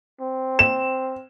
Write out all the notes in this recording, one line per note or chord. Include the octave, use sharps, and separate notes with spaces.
C4
E7